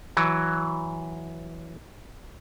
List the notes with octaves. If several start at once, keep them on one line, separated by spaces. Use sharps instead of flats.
E3 F#3